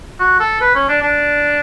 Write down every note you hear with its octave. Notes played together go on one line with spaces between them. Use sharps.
F#4
A4
B4
C#4
D4
D4